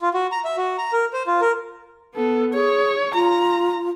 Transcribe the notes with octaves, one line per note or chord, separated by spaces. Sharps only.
F4
F#4
A#5
E5
F#4
A#5
A#4
C5
F4
A#4
B3 A4
G#4 C#5
F4 A#5